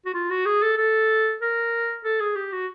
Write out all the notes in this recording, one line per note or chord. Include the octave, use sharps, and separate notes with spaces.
F#4
F4
F#4
G#4
A4
A4
A#4
A4
G#4
G4
F#4